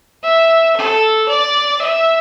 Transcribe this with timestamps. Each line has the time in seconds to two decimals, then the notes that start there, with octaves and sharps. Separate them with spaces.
0.24 E5
0.76 A4
1.29 D5
1.81 E5